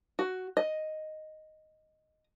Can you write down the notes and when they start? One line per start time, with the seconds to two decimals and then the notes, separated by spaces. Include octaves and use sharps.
0.19 F#4
0.57 D#5